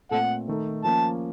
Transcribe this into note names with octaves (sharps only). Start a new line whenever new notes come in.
A#2 A3 C4 A4 F#5
D#3 A3 D#4 A4
F3 A#3 C#4 A5